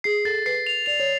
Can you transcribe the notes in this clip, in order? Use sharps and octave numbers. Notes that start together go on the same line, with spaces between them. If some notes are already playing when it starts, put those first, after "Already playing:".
G#4 C7
A4 A6
B4 C7
F7
D5 F7
C#5